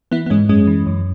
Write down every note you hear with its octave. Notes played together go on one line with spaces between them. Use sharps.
E3 B3 E4
B3
G#2 G#3 C#4
F#2 G#3 C#4
E3
F#2